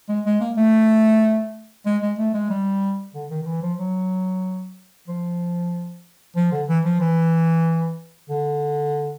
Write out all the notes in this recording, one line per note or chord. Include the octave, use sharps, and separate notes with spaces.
G#3
G#3
A#3
A3
G#3
G#3
A3
G#3
G3
D3
D#3
D#3
E3
F3
F#3
F3
F3
D3
E3
F3
E3
D3